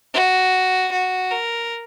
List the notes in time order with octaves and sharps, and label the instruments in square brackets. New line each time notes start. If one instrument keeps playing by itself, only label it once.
[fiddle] F#4
F#4
A#4